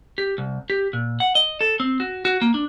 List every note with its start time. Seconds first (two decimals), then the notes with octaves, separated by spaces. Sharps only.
0.18 G4
0.38 C2
0.70 G4
0.93 A#2
1.20 F#5
1.35 D#5
1.61 A4
1.80 C4
2.00 F#4
2.25 F#4
2.41 A#3
2.54 D4